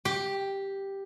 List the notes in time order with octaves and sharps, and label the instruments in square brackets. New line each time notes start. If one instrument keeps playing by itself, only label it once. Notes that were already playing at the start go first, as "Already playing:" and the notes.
[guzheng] G4